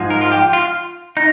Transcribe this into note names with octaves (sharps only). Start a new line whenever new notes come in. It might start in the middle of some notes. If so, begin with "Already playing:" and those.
Already playing: G#2 F3 G#3
A#4
F4
G4
F4
D#4